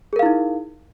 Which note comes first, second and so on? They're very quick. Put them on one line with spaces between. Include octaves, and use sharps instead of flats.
G#4 A#4 F5 E4 D#4